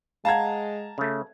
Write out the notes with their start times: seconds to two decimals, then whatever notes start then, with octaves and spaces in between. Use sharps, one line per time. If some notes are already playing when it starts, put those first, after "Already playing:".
0.25 G#3 F5 F#5 A5 A#5 G#6
0.98 C#3 A3